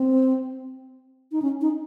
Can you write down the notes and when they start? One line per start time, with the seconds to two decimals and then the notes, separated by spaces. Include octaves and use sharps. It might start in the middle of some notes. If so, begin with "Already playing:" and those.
Already playing: C4
1.32 D#4
1.42 C#4
1.61 D#4